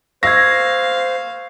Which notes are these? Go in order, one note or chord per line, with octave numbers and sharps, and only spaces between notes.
C5 F5 C#6 E6 G#6 A#6